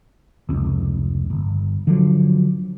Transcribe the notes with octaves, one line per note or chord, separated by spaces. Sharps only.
F1 C#2
G1
D3 F3 F#3